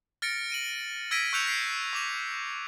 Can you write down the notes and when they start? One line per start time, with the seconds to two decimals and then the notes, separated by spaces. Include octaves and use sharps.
0.22 F6 A6 A#6 C#7 D7
0.50 D7 D#7 F#7
1.11 E6 G#6 A#6 B6 D7 D#7
1.33 C#6 E6 F#6 G6 C#7 F7
1.46 F#6 B6 C7 D7
1.93 C#6 D6 F7